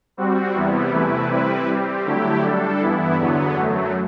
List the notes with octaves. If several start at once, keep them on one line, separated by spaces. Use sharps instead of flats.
G3 C4 F#4
E2 C3 G3 B3 E4
C3 E3 A3 E4 B4
G3 C4 E4 B4
G3 C4 G4
D3 F#3 A3 E4 G4
G3 D4 A4
G2 E3 B3 E4
E2 D3 F#3 B3
F#2 F#3 A3